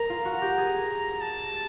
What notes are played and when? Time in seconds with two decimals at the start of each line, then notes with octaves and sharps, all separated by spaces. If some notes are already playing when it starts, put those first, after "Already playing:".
Already playing: A#4 A#5
0.10 F4
0.25 F#4
0.42 G4
0.58 G#4
1.21 A5